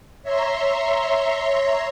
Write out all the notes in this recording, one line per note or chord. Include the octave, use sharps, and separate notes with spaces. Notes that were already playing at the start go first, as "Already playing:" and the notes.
C#5 E5 A#5 C6